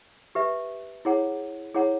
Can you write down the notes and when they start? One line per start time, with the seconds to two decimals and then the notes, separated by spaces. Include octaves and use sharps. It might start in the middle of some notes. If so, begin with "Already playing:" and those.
0.35 G4 B4 E5
1.05 E4 G#4 C#5 F#5 A#5
1.74 E4 G#4 C#5 F#5 A#5